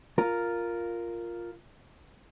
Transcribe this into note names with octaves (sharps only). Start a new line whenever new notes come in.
F4 A#4